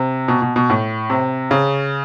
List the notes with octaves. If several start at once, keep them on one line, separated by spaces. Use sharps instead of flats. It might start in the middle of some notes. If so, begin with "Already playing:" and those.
Already playing: C3
B2
B2
B2
A2
C3
C#3